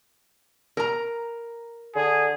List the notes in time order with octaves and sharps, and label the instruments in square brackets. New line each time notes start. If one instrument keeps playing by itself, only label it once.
[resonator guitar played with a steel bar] A#4 A#5
[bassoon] D3 [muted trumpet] G#4